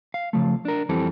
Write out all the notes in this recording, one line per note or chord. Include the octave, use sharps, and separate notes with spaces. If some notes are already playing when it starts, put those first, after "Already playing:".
F5
C#3 F3 A3
D4 A#4
F2 E3 G3 C4 A4